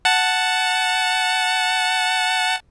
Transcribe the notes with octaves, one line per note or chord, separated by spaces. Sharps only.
F#5 A5